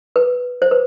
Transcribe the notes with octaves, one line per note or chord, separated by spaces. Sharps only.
B4
C5
B4